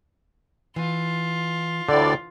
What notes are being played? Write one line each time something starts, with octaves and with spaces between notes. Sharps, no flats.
E3 F4
D2 A2 D3 D5